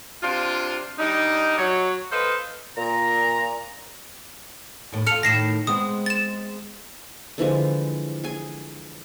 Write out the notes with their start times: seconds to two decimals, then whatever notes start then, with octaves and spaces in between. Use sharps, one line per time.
0.23 C3 D4 F4
0.99 G3 D4 D#4
1.58 F#3 C#5
2.12 A4 B4 C5 D#5 F5
2.78 A#2 A#5
4.92 D#2 A2
5.07 F4 A4 F6 C#7 F7
5.23 A2 D#3 A#6 C7 E7
5.67 G#3 B3 C4 D#6
6.06 A6 E7
7.38 D3 E3 F3 G#3
8.24 G#4 G#5